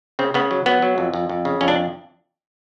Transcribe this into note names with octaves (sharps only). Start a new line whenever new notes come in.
C#3 C4
C#3 B3
F#3
F#3 B3
F#3
F2
F2
F2
C#3
F2 C#4
D4